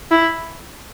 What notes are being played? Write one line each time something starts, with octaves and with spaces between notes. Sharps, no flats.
E4